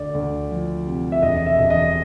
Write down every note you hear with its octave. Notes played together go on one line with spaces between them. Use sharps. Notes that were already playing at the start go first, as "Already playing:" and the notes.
Already playing: D2 D5
D2
F3
C3
E5
E1 D#5
E5
E1
D#5